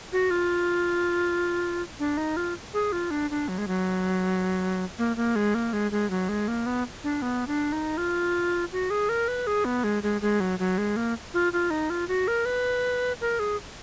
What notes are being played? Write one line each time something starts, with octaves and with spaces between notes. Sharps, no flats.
F#4
F4
D4
D#4
F4
G#4
F4
D4
D4
F#3
G#3
F#3
A#3
A#3
G#3
A#3
G#3
G#3
F#3
G#3
A#3
B3
D4
B3
D4
D#4
F4
F#4
G#4
A#4
B4
G#4
B3
G#3
G#3
G#3
F#3
F#3
G#3
A#3
F4
F4
D#4
F4
F#4
A#4
B4
A#4
G#4